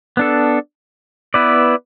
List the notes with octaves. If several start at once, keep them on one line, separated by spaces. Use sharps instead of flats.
B3 D4 A4
B3 E4 B4 D5